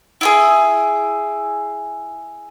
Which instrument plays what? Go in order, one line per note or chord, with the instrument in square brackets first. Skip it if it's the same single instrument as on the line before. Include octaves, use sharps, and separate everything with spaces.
[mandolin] E4 F4 G#4